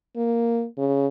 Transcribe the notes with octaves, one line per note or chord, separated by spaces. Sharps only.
A#3
C#3